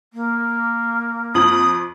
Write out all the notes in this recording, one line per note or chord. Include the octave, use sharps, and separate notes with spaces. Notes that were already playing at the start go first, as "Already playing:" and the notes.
A#3
F2 D#6 F#7